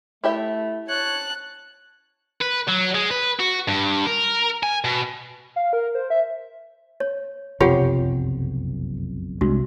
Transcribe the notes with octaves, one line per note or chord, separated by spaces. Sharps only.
A3 E4 G4 E5
C#5 A5 F#6
B4
F#3
G#3
B4
F#4
G2
A#4
G#5
B2
F5
A#4
C5
E5
C#5
F#1 B1 F2 C3 F4 G4 C#5 F#5
C2 G#3 D4 F#4